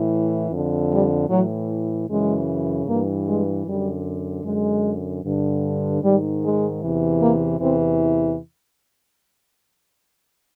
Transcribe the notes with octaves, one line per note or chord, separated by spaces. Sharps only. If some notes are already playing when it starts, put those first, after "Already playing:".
Already playing: A2 E3
F2 D3
G3
A2 E3 F#3
F#2 C#3 E3 G#3
G2 E3 A#3
G#3
F#2 D3 G3
F#2 D3 G#3
G2 D3
G#2 D#3 G3
G#3
E2 C3 E3
A#3
E2 C3 E3 C4